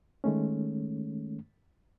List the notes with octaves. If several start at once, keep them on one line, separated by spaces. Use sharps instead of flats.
D#3 G#3 A3 C#4